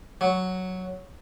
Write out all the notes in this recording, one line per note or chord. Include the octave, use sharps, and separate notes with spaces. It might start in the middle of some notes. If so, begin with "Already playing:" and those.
F#3